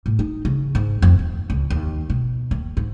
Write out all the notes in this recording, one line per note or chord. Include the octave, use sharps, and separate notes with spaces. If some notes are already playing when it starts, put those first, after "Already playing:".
A2
D#4
C#3
G#2
F2
D#2
C#2
D#2
B2
D#2
G#2